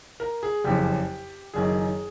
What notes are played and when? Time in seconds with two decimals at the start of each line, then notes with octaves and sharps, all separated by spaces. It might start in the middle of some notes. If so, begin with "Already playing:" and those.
0.20 A#4
0.43 G#4
0.64 F#1 F2 C#3 G4
1.54 F#1 F#2 D#3 G#4